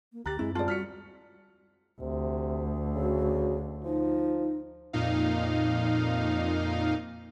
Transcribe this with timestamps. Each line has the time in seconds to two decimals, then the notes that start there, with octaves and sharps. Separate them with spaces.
0.13 A#3
0.26 D2 G4 A#5 F#6 A6
0.39 F#2 G#3 C4 E4
0.55 D#1 G#3 F4 D5 A5
0.68 G3 F#4 F6 B6 C#7
2.01 D2 C3
2.95 C#3 F#4
3.85 F3 D#4
4.93 F2 A#2 D#4 F5